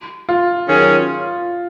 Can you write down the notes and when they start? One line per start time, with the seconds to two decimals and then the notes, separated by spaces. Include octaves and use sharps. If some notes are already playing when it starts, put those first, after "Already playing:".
0.29 F4
0.68 D#3 F#3 C#4 G#4